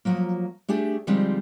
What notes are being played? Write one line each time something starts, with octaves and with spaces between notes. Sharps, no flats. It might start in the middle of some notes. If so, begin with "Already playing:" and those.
F3 F#3 A#3
A3 D4 G4 G#4
D3 F3 G3 G#3 C4 D#4